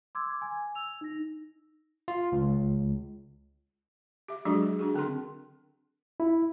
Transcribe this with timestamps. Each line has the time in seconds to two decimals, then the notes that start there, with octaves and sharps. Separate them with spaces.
0.15 C6 D6 E6 G#6
0.41 G#5 G#6
0.75 E6 F7
1.01 D#4 A#6
2.08 F4
2.32 C#2
4.28 G4 E5
4.45 F#3 G#3 D4 F#4 G#4
4.63 G#4
4.79 D4 F#4 G#4
4.94 D3 C4 D4 A#4 C6
6.20 E4